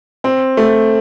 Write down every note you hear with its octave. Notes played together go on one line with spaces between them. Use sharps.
C4
A3